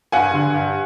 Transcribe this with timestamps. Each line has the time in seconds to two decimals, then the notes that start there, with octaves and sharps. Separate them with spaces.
0.12 G2 F#5 G#5
0.34 D3
0.54 G2